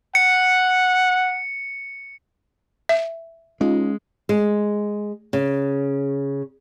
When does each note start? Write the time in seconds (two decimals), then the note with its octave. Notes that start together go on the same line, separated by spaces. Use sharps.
0.15 F#5 C#7
2.89 E5
3.61 G#3 C#4 D#4 F4 D#5
4.29 G#3
5.33 C#3